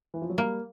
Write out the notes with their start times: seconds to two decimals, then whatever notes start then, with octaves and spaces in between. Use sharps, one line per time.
0.14 E3
0.22 F3
0.30 F#3
0.38 G3 A#3